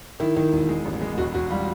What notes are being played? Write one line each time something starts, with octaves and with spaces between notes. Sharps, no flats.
D#3 E4
D#3
E1
G#3
A1
G#3
E1 F#4
E1 F#4
G3 F4